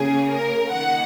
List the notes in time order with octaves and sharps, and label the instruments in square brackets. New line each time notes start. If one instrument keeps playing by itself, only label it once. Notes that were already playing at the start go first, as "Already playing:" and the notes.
Already playing: [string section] C#3 A#3 G#4
A#4
D#3 A#3 F#5